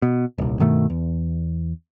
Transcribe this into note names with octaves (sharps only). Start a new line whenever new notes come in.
B2
D#1 C2
G2 B2 D#3 A3
E2